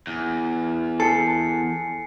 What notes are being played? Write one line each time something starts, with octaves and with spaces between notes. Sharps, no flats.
E2
A4 G#5 C7 C#7